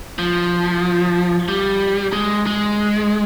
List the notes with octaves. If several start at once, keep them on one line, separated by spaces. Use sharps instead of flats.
F3
G3
G#3
G#3